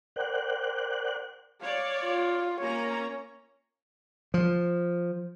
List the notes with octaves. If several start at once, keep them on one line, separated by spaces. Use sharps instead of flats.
A#4 C5 D5 F#5 G5 F#6
C#5 D5 F5
F4
A#3 C#4 C#5 A#5
F3